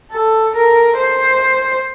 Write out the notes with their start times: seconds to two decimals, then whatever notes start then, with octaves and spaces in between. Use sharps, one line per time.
0.12 A4
0.55 A#4
0.98 C5